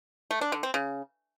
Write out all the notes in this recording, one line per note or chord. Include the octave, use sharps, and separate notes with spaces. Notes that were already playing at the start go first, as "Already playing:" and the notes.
A3
D4
D3
C4
C#3